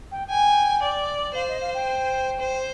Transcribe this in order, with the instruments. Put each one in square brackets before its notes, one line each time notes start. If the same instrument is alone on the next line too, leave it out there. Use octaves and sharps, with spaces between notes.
[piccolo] G5
[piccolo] G5 [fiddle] G#5
[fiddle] D5
[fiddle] C5 [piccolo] F5
[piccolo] D#5
F5
G5
[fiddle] C5